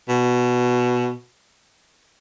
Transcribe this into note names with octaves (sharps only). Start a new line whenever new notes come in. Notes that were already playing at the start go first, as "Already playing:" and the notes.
B2